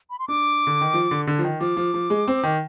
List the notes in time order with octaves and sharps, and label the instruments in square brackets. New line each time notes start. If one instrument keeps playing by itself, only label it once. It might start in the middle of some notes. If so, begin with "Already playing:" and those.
[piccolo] B5
C6
[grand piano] D4 [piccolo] D6
[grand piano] D3
D#3
F3
D3
D3
F3
D#3
[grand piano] F3 [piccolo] D6
[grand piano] F3
F3
G#3
C4
D#3